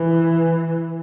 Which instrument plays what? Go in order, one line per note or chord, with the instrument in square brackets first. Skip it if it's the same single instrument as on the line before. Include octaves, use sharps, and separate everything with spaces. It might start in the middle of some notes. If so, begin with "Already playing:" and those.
Already playing: [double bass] E3